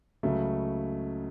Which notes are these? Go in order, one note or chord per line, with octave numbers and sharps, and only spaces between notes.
C#2 C#3 F#3 A3